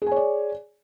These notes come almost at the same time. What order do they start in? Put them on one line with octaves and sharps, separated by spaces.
G#4 G#5 C#5 D5